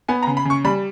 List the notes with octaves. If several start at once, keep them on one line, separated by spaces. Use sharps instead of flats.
B3 G#5
A#5
C#3
B5
C#3 C#6
G3 B5